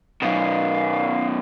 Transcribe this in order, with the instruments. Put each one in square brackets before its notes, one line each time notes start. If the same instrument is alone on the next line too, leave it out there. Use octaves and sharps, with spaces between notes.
[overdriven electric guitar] F#2 B2 [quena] F5